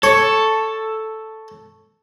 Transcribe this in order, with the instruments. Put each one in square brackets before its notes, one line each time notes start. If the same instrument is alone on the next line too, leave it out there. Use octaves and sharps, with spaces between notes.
[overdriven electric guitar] A4 [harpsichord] C#5